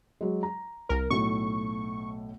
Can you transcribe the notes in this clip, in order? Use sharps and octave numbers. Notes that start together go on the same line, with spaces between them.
F#3 G#3
A#5
C2 A#4
B1 A2 A3 C#6